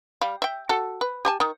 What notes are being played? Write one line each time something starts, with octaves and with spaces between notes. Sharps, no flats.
G3 F5
E5 G5
F#4 A4
B4
G4 G#5 A5
D#3